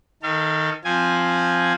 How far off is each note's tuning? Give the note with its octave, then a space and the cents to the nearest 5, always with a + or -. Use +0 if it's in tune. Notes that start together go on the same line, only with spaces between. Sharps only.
D#3 +10 A4 +35 F5 -35
F3 +0 C4 +0 G#5 +0